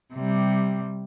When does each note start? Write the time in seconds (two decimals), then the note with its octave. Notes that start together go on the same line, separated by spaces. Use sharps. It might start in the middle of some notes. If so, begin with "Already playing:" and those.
0.14 C3 G3